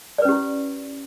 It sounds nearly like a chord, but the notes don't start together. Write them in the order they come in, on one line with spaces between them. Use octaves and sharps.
D5 B4 C#4 G4 E4